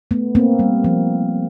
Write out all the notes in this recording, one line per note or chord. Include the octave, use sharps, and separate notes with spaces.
A3 B3
A#3 C4
G3
F3